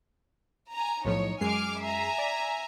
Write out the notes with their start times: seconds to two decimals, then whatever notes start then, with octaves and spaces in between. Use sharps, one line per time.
0.73 G#5 A#5
1.05 B1 A2 F3 D#4 C#5
1.41 F#2 G#3 G#5 D6 F6 C7
1.82 E5 G#5 A#5
2.18 D5